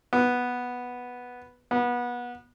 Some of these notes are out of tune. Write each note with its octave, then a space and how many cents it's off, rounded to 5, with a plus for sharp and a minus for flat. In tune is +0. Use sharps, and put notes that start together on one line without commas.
B3 -5
B3 -25